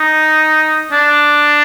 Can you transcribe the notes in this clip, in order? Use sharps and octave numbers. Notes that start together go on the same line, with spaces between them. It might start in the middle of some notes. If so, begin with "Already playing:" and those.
Already playing: D#4
D4